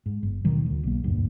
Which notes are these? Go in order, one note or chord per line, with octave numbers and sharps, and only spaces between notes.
G#2
G1
D#2 B2 D#3 G3
D2
B1 A#3
F1 D2 G2 A#2